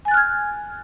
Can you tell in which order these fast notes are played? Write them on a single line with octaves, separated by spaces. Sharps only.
G#5 A6 F#6 F6 G#6